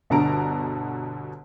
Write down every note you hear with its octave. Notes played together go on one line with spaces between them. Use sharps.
G1 B2 D3 A5 A#5 D7